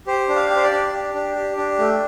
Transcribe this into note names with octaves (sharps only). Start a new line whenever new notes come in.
G4 C5
D4
F5
G4
C5
D5
D4
G4
D4
G4
D4
A3